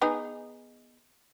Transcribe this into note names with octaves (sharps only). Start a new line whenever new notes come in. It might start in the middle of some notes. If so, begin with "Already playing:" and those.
B3 D#4 G#4